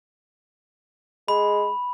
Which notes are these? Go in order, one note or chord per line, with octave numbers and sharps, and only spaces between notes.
G#3 B5